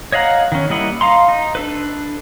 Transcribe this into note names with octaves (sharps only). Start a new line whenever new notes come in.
C#5 D#5 F5 F#5 A#5
D#3 C#4
G3 A#3 E4 D#5 F#5
D#4 F5 A#5 C6
D#4
D4 A4 B4